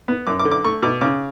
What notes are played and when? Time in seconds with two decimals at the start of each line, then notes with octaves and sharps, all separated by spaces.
0.08 B3
0.27 F#2 D6
0.39 D6
0.45 D3
0.51 D6
0.64 A3 C#6
0.82 B2 D6
1.01 C#3 D6